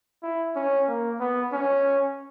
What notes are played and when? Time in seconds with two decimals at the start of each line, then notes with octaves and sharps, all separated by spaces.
0.23 E4
0.56 C#4
0.88 A#3
1.20 B3
1.52 C#4